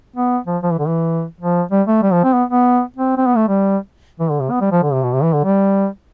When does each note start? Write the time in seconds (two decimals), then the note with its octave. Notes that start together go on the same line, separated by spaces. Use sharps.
0.16 B3
0.47 F3
0.63 F3
0.72 E3
0.79 D3
0.87 E3
1.41 F3
1.72 G3
1.88 A3
2.03 G3
2.13 F3
2.24 C4
2.33 B3
2.49 B3
2.96 C4
3.17 C4
3.27 B3
3.37 A3
3.48 G3
4.20 E3
4.30 D3
4.40 C3
4.51 B3
4.61 G3
4.72 F3
4.83 D3
4.93 C3
5.03 B2
5.14 C3
5.23 E3
5.33 D3
5.44 G3